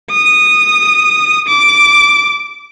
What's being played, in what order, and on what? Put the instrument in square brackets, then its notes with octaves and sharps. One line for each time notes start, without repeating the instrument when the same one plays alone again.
[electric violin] D#6
D6